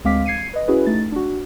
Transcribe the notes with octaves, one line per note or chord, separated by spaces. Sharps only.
D2 G#3 C4 F5 D6 B6
G#6 C7 C#7 D#7
B4 D#5
C#4 E4 F#4 G#4 B4
A3 D#4 A6
D4 F#4